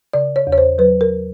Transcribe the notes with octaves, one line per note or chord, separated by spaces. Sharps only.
C#3 D5
C#5
E2
C#5
C5
F#3 B4
A#4